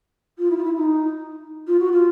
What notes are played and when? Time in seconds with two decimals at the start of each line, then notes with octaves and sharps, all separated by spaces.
0.38 F4
0.50 E4
0.57 F4
0.63 E4
0.76 D#4
1.67 F4
1.79 F#4
1.91 F4